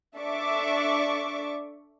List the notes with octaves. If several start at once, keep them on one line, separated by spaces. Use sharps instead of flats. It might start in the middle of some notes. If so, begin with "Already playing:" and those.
D4 A4 D5 E5 C#6 D6